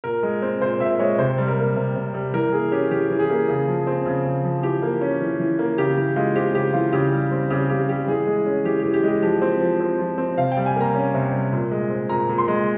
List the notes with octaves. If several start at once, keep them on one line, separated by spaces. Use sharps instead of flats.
A#2 A#4
G#3
C4
A#2 C5
A#2 E5
G#3 C#5
C3 C5
G3
A#4
A#3
C3
C3
G3
E3 A#4
A#3 G#4
C#4 G4
E3 G4
E3
G#4
A#3
C#3
F3
C4
C#3
C#3
F3
E3 G4
A#3
C#4
E3
E3
A#3
C#3 G4
E3 G4
G#3 F4
C4 G4
C#3 G4
E3 F4
C#3 G4
G3
C4
C#3 G4
C#3 G4
G3 G4
E3 G#4
G#3
C#4
E3 G4
E3 G4
G4
G#3
G4
F3 G4
C4
F3
C4
F3
C4
C3 F5
G5
G3
G#5
A#3 A#5
C#4
C3
G3
A#2
G#3
C4
A#2 A#5
A#2
C6
G#3